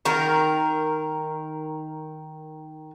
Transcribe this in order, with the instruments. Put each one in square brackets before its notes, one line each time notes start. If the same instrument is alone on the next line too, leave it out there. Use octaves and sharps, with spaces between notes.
[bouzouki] D#3 A#4